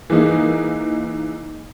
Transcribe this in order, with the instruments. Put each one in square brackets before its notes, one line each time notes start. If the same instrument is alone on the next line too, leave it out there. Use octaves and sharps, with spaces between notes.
[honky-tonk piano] E3 G#3 A#3 D#4